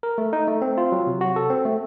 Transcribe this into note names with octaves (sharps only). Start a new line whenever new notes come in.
A#4
A3
D#4
A3
C4
F4
F#3
C3
F#4
A4
C4
A3